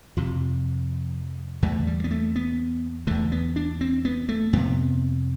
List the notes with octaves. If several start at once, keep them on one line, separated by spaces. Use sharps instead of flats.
F2 C3 F3
E2 D3 A3
G3
B3
A3
B3
E2 D3 A3
B3
D4
C4
B3
A3
F2 C3 B3